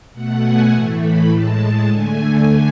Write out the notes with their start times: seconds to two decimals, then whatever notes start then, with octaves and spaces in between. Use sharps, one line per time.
0.13 B2 A3 F#5
0.42 G#5
0.71 A2 E3 A3
1.00 B5
1.28 A2 G#3 A5
1.86 D3 A3 G#5